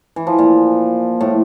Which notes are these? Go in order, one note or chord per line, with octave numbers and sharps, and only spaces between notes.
E3
F3
A#2
A2